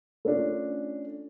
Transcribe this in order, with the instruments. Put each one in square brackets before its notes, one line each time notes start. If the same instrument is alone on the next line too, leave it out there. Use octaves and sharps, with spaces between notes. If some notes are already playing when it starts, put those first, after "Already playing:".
[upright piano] A3 C#4 D4 F4